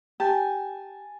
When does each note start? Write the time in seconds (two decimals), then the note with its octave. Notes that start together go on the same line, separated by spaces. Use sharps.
0.20 G4 G#5 A5